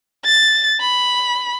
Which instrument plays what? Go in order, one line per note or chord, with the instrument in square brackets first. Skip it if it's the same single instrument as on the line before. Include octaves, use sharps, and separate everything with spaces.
[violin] A6
B5